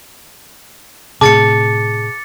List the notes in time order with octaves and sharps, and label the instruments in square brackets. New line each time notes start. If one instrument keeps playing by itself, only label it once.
[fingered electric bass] A2 C3 [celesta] G#4 A5 [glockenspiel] D6 A6 C#7